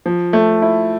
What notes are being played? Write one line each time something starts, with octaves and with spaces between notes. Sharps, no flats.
F3
A3
E4